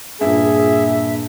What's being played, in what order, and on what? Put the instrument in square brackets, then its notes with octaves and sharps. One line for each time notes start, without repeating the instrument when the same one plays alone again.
[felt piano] G2 A#2 [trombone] G#4 [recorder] E5